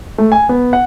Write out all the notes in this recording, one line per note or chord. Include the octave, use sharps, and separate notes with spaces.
A3
G#5
B3
F#5